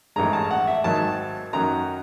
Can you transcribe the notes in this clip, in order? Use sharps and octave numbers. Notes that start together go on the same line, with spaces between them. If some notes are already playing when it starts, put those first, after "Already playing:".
A1 G2 D#3 G#3 A#5
A5
F#5
E5
G#1 G#2 D#3 F#3 A5
F#2 D#3 F#3 A#5